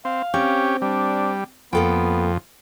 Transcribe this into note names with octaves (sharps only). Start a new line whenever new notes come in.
C4 F5
C4 C#4 G4
G3 D4
F2 A#3 B3 A4 G5